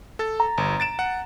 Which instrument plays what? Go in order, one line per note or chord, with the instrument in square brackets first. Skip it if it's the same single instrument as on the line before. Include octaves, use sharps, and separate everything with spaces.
[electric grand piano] A4 A6
[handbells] A#5
[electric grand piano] G1
A6 D7 E7
F#5